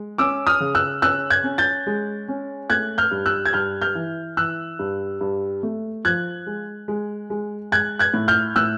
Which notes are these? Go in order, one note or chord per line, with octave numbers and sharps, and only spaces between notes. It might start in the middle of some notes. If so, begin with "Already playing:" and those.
Already playing: G#3
C#4 D6 E6
D#6 F6
C#3
E6 F#6
C#4 E6 F#6
F#6 G#6
C#4
G6 A6
G#3
C#4
A3 F#6 G#6
F6 G6
G2
E6 F#6
G#6
G2 F6 G6
F6 G6
E3
E3 E6 F#6
G2
G2
A3
F3 F#6 G#6
G#3
G#3
G#3
G#3 F#6 G#6
F#6 G#6
A2
F6 G6
A2 E6 F#6